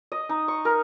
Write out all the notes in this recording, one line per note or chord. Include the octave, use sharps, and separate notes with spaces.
D#5
D#4
C#6
A#4